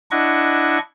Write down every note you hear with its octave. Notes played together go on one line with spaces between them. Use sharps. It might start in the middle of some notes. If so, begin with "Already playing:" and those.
D4 E4 D#5 F#5 C#6